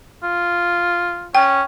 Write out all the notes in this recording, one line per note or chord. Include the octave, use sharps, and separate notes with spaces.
F4
C#4 G5